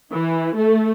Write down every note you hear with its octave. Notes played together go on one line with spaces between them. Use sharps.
E3
A3